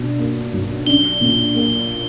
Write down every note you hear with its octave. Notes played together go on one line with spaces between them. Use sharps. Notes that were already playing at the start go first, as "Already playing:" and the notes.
Already playing: B2 D4
A#3
B1
D4 G7
A#2
A#3